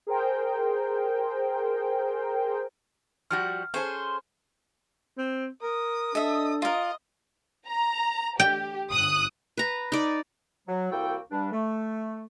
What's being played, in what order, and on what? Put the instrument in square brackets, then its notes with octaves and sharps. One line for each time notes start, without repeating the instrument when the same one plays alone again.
[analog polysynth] G#4 A#4 C5 G5
[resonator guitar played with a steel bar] F3 G3 F#4 [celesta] F6
[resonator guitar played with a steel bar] C#4 G#4 A4 [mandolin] C5
[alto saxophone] C4
[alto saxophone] A#4 [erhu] D#6
[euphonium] D4 [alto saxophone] A4 [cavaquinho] D#5 E5
[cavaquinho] F4 A#4 [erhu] D#5
[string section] A#5
[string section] G4 [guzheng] G5
[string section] G1 D#6 F#6
[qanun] B4 A#5
D#4 D5
[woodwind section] F#3
C2 A#3 E4 F#4 A4 G5
G2 G3 D4
A3